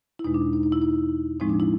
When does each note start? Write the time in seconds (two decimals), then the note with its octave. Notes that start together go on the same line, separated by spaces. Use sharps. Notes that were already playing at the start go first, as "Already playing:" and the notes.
0.19 E4
0.24 E2 B2 G#3 D#4
0.34 D4
0.53 D#4
0.63 D#4
0.72 E4
0.82 D#4
1.40 A2 F3 G#3 C4 D#4
1.49 D4
1.60 E4